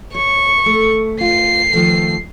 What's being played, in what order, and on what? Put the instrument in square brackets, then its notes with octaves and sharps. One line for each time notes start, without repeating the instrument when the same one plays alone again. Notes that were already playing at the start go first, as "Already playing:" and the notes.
[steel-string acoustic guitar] C#5 [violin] C#6
[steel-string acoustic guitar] A3
[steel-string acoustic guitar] F4 [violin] C7
[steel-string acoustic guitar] D#3 F3 A3